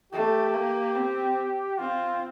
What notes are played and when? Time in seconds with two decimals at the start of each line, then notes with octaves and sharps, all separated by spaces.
0.12 A3 G4
0.54 A#3
0.95 C4
1.78 C4 F4